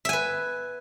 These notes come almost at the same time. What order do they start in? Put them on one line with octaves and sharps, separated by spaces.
E5 G#5 B4